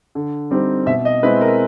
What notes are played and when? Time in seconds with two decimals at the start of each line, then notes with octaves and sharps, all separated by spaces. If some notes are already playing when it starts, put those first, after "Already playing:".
0.15 D3
0.51 G3 C4 D#4
0.86 B2 E5
1.05 D#5
1.23 G#3 C4 E4 B4
1.41 A#4